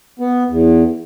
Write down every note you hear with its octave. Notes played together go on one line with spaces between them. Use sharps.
B3
E2